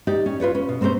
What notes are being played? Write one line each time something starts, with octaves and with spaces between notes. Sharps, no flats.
D#4 G4 D5
C#4
F4 B4 C#5 D5
C#4
B2
A#3 C4 C#4 A4 C5